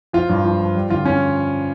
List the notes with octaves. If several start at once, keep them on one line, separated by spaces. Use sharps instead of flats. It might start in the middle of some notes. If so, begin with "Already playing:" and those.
F3 F4
G2
F3
F3
G3
D3 F4
C#4